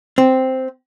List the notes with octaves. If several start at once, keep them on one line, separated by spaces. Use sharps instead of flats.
C4